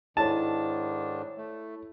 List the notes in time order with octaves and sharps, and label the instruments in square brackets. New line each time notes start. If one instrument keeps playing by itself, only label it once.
[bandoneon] G#2 D#3 D4 [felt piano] E4 A4 C#5 [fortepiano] A5
[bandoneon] A3